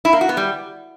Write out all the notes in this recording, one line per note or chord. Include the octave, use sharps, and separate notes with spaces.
E4
A#3
F#4
B3
G3